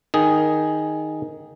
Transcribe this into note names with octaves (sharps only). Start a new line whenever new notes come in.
D#3 G#4